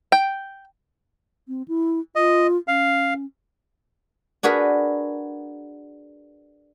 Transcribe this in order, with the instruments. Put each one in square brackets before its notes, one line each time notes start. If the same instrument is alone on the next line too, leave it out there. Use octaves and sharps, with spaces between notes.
[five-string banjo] G5
[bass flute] C4
E4
[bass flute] F4 [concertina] D#5
[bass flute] C#4 [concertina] F5
[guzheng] D4 F#4 G#4 A#4 B4